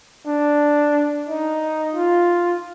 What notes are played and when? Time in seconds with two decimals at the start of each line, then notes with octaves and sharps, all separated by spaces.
0.27 D4
1.29 D#4
1.95 F4